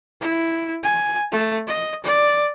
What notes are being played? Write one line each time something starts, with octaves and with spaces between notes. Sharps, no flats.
E4
G#5
A3
D#5
D5